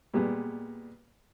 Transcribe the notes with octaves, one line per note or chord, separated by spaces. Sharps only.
A#2 G3 G#3 B3